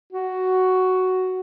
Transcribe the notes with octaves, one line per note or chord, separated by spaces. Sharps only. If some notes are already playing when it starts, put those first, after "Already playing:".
F#4